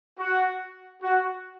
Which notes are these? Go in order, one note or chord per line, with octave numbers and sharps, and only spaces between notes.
F#4
F#4